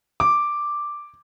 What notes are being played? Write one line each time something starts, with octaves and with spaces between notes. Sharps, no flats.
D6